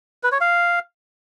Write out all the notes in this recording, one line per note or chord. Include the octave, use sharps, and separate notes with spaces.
B4
C#5
F5